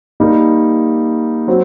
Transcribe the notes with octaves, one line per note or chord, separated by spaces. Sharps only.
G3 A#3 D#4
F#3 C4